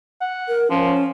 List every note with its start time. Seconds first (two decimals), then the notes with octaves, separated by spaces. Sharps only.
0.21 F#5
0.48 A#4
0.70 F3 C#4